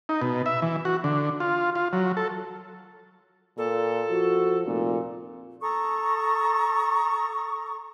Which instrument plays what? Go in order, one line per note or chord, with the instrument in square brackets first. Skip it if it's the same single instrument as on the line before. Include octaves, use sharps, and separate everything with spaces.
[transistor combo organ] D#4
B2
E5
E3
F#4
D3
F4
F4
F#3
A4
[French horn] A#2 [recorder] A4
[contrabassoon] F3 [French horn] F#4
[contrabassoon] F1 [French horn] A#2
[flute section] A4 A#5 C#6 D#6